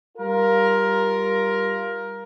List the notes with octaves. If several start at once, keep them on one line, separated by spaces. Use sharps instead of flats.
G3 F4 A#4